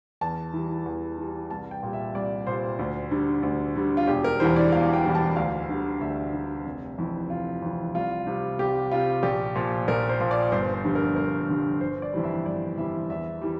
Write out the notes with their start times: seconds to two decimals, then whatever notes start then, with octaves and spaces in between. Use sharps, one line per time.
0.21 E2 A5
0.53 E3 G3
0.86 E2
1.18 E3 G3
1.51 C2 A5
1.71 G5
1.83 A#2 G3
1.93 E5
2.15 C2 D5
2.47 A#2 G3 C5
2.79 D2
3.11 D3 G3
3.43 D2
3.76 D3 G3
3.97 F4
4.07 E1 G4
4.24 A#4
4.40 E2 E3 G3 C5
4.56 D5
4.72 E1 F5
4.93 G5
5.04 E2 E3 G3
5.15 A5
5.36 D2 F5
5.69 D3 G3
6.01 D2 E5
6.33 D3 G3
6.66 F1
6.98 F2 E3
7.29 F1 F4
7.62 F2 E3
7.95 C2 F4
8.27 C3 G3
8.59 C2 G4
8.91 C3 G3 F4
9.23 A#1 G4
9.55 A#2 F3
9.88 A#1 A#4
10.09 C5
10.20 A#2 F3
10.31 D5
10.52 G1 C5
10.74 C5
10.84 F2 D3 G3
10.95 A#4
11.16 G1 A#4
11.49 F2 D3 G3
11.81 G1 C5
12.02 D5
12.13 F2 E3 G3
12.24 E5
12.46 G1 D5
12.78 F2 E3 G3 E5
13.10 E2 E5
13.42 E3 G3